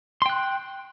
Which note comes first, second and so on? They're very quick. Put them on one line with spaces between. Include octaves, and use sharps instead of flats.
C6 G5 F#6